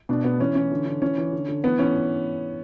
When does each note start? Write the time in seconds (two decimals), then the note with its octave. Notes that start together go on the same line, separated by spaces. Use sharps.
0.09 B2 D4
0.24 B2 B3
0.39 E3 C#4
0.55 E3 C#4
0.71 D3
0.86 D3
1.02 E3 C#4
1.18 E3
1.33 D3
1.48 D3
1.63 E3 B3
1.79 E3 C#4